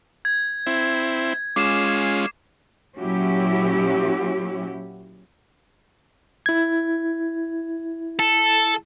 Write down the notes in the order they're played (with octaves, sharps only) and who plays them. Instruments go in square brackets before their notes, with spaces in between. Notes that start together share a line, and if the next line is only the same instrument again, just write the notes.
[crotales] G#6
[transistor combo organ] C4 E4
[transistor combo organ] G#3 C#4 F4 [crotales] D6 C7 E7
[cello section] A#2 F#3 C#4 E4 F#4 G4
[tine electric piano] E4 G#6
[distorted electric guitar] A4